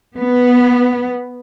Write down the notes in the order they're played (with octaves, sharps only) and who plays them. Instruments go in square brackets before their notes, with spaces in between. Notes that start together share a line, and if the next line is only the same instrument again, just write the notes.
[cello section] B3